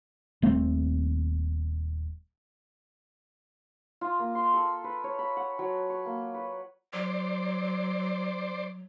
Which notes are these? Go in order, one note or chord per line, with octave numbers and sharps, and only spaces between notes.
D#1 A3 C4
F4
A#3
C6
A4
B4
C#5
B5
F#5
F#3
C#6
A#3
B4
F#3 C5 D5